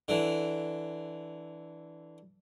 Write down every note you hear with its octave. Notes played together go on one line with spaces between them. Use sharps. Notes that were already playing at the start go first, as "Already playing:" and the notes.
D3 E3